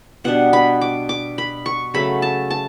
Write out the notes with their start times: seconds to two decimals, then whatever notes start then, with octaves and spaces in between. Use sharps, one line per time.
0.24 B2 G3 D4 F#5
0.53 B5
0.81 D6
1.09 D6
1.38 B5
1.66 C#6
1.94 C#3 F#3 A3 B5
2.22 A5
2.50 A5